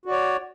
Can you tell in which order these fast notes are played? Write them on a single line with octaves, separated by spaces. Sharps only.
F#4 D5 C#5